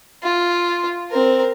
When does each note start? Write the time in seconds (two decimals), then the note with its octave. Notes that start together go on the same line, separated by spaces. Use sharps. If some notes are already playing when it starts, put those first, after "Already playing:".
0.23 F4
1.11 C4 A#4